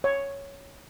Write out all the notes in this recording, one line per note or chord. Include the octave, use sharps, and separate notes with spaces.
C#5